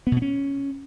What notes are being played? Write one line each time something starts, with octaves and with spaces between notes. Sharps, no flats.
B3
B2
B3
C#4